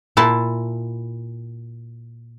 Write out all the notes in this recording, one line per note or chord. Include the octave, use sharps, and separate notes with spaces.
A#2 E4 A5